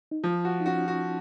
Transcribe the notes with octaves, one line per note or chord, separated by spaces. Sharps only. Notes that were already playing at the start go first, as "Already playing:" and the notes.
D#4
F3 F4
F#4
D#4
C#4 F#4
F#4